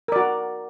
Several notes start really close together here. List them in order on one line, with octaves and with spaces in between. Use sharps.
A#4 D5 F#4